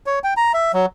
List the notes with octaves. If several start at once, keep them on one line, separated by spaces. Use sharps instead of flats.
C#5
G5
A#5
E5
F#3